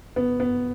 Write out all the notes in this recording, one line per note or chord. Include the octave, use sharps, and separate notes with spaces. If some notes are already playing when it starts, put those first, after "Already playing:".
B3
B3